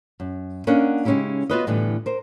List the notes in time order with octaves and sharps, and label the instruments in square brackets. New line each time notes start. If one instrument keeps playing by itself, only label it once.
[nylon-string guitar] F#2
A#3 C#4 D4 A#4 D#5 F#5
C#3 G#3 C#4 D#4 E4 G4
B3 F4 F#4 B4 C#5 D#5
A2 D3 E3 G3 B3
A#4 C5